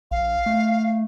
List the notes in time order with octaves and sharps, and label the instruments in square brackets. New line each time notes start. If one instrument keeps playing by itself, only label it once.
[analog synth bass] A#1 [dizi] F5
[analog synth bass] A3